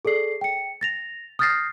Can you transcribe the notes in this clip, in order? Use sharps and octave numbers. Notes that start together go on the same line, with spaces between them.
G#4 A4 D5 C7
G5 C#7
A6 A#6 F7
D#6 F6 G6 A6 A#6 C7